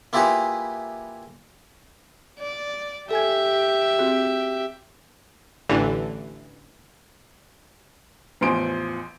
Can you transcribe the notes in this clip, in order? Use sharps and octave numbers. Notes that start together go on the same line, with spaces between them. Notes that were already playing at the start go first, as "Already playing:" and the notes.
A#3 E4 F4 G4 G#4 B4
D5
G4 A4 E5 G#5 G#6
C4 F#4 G#4
A1 D3 E3
A1 E2 F3 C6 D7